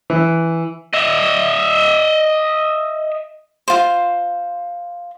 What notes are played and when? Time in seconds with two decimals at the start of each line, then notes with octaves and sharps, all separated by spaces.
0.10 E3
0.94 D#5 E5
3.68 F4 C5